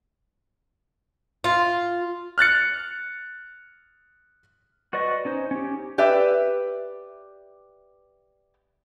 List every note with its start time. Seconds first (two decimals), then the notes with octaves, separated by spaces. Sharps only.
1.44 F4
2.38 F6 F#6 A6 C#7
4.93 F#4 B4 D5 D#5 C#6
5.25 C#4 D#4 C5
5.51 C#4 G4
5.98 G4 B4 D5 E5